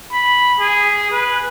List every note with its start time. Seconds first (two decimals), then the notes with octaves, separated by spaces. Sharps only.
0.12 B5
0.59 G#4
1.11 B4